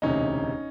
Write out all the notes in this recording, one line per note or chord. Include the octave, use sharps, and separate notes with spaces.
E1 D2 C3 C#4 D#4